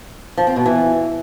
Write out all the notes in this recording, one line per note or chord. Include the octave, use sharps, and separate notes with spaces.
F3
C4
B2
E3